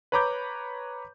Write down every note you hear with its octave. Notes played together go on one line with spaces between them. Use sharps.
B4 C#5 A#5 B5 D6 G6